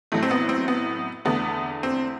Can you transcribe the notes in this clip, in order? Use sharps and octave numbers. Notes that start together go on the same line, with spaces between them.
A1 A2 F#3 A3
C4
B3
C4
B3
E2 D3 A3 B3
C4